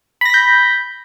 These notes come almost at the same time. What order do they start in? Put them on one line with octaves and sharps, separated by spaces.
B5 A#6 B6 G6